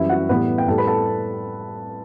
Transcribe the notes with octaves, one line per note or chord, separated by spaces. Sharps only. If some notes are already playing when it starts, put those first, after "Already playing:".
Already playing: F#2 E3 G3 E4 E5
F#4 F#5
A2 E3 G3 B3 B4
G5
A2 G3 A4 A5
B4 B5
A4 A5